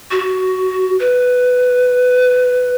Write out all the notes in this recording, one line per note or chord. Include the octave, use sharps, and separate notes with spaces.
F#4
B4